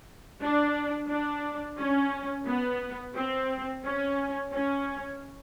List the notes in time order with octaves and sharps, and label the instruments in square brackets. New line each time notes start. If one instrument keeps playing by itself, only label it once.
[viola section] D4
D4
C#4
B3
C4
C#4
C#4